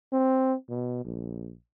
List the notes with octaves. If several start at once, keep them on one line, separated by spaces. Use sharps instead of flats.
C4
B2
A#1